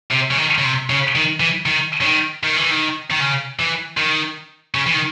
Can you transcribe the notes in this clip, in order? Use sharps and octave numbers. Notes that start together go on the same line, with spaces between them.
C3
C#3
D#3
C#3
C3
C#3
D#3
E3
D#3
C#3
D#3
D#3
E3
D#3
D#3
C#3
E3
D#3
C#3
E3
D#3